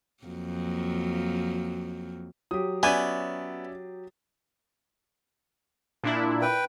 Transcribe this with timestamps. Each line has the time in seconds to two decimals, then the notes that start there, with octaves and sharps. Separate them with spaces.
0.24 F2 F#3 A#3
2.51 F#3 G4 D#6
2.83 B3 C#4 D5 E5 G#5
6.04 A#2 D4 E4
6.42 B4 G5